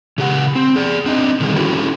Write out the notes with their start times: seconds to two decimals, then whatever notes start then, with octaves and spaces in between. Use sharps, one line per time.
0.18 C#3 G4 F#5
0.55 C4
0.76 G#4 D5
1.06 C4 D4 D#4 D#5
1.40 D3 D#3 G3 C4 G#4
1.56 C#4 E4 F#4 G4 A4 B4